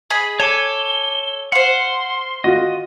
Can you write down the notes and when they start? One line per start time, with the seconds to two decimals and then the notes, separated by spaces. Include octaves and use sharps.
0.10 G#4 D#5 B5
0.40 A4 C#5 G#5 D6 G7
1.52 C5 F5 F#5 C6
2.44 F4 F#4 D#5